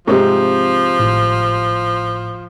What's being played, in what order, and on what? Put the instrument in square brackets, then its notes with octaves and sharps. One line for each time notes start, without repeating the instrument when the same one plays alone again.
[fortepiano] G#2 C3 [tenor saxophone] F3 [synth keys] G#3 C4
[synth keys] G#1 A2